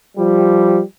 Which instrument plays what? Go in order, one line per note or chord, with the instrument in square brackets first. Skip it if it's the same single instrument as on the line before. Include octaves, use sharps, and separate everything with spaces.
[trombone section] F3 G3